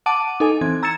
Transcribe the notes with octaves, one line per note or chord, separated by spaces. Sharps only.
F#5 A5 D6 D7 D#7
D#4 A4 G#5
E3 C4 G#6
A#5 E6 G#6 A6 C#7 E7